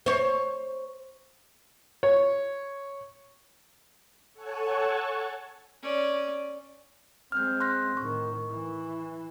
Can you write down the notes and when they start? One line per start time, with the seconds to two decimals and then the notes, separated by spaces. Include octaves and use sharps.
0.06 C5 C#5
2.03 C#5
4.33 A4 C#5 F#5 G#5 A5 C#6
5.83 C#4 D5
7.32 G#3 C4 F6 G6
7.60 C6 F#6 A#6
7.97 A2 D#3 C#6
8.51 E3